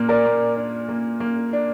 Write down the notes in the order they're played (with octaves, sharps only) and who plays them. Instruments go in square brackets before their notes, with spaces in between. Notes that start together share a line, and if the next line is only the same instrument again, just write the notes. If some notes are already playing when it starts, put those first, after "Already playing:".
Already playing: [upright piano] A#2 A#3
[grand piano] A#4 D5
[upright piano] A#3
D4
A#3
A#3
D4